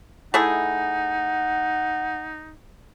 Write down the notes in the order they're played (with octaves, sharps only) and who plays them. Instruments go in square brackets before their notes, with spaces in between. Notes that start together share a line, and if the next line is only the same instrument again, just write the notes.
[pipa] A3 E4 G#4 [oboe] D#4 [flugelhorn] F#5